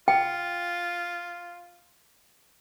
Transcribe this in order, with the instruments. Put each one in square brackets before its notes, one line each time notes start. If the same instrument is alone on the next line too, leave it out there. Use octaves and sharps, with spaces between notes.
[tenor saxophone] F4 [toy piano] G5